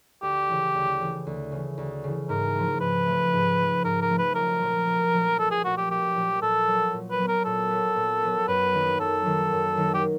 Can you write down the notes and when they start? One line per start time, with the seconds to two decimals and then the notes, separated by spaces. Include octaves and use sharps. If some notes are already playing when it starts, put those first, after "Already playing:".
0.22 D2 G4
0.49 C#3 E3
0.75 D2
1.00 C#3 E3
1.27 D2
1.52 C#3 E3
1.78 D2
2.04 C#3 E3
2.29 G#2 A#4
2.55 F3 A3
2.81 G#2 B4
3.06 F3 A3
3.33 G#2
3.59 F3 A3
3.84 G#2 A#4
4.01 A#4
4.10 F3 A3
4.19 B4
4.35 B1 A#4
4.61 A#2 F3 A3
4.87 B1
5.13 A#2 F3 A3
5.38 B1 A4
5.51 G#4
5.64 A#2 F3 A3 F#4
5.77 G4
5.91 B1 G4
6.15 A#2 F3 A3
6.41 A#2 A4
6.68 F#3 B3
6.93 A#2
7.11 B4
7.19 F#3 B3
7.28 A#4
7.45 A#2 A4
7.71 F#3 B3
7.96 A#2
8.23 F#3 B3
8.48 F#2 B4
8.73 D#3 F#3 A#3 D#4
9.00 F#2 A4
9.25 D#3 F#3 A#3 D#4
9.52 F#2
9.77 D#3 F#3 A#3 D#4
9.94 G4